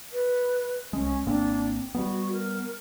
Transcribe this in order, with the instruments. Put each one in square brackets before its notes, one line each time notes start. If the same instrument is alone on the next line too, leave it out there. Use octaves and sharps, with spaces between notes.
[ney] B4
[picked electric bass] C2 G#3 [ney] C#4
[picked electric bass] G#1 A#3 C4 [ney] D4
[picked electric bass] G3 A#3 B3 [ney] F#4
[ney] A#4